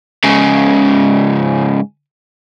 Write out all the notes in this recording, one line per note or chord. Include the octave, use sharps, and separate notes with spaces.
G#2 C#3